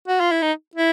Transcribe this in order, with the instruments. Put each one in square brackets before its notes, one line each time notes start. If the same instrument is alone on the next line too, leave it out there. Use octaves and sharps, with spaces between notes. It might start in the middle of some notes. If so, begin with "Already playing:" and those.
[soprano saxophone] F#4
F4
E4
D#4
E4